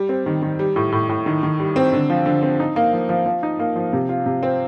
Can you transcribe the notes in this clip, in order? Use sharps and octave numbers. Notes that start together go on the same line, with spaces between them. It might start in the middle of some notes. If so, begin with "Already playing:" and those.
Already playing: G3
C4
D#3
D#3
G3
A2
A2
A2
D#3
D#3
G3
C4
D3
F3
D3
C4
D#4
A#3
F3
F3
F3
D#4
A#3
F3
C3
F4
C3
C4